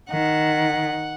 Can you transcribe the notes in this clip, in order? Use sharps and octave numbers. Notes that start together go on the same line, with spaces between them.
D#3 F#5